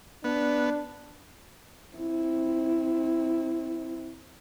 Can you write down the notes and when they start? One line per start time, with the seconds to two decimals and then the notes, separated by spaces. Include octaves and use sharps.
0.24 B3 D4
1.96 C4 E4